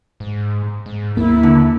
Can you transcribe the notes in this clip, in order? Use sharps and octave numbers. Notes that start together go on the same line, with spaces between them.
G#2
G#2
D#2 A#3 E4
D3